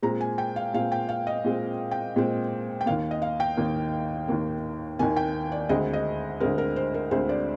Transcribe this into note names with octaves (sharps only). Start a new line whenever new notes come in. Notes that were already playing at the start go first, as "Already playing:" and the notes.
A#2 G#3 C4 A#5
G#5
G5
F5
A#2 G#3 C4 F5
G5
F5
D#5
A#2 G#3 C4
G5
A#2 G#3 C4
G5
D#2 D#3 A#3 F5
D#5
F5
G5
D#2 D#3 A#3
D#2 D#3 A#3
D#2 D#3 A#3 G#5
G5
D5
D2 D3 G#3 C4 D#5
D#5
D2 D3 G#3 C4 A#4
A#4
C5
A#4
D2 D3 G#3 C4 C5
D5